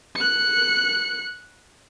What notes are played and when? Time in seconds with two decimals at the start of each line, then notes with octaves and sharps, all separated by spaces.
0.16 F#6 C#7